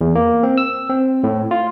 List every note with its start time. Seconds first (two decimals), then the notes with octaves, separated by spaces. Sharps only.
0.01 E2
0.15 A#3
0.43 C4
0.58 E6
0.89 C4
1.23 A2
1.51 F4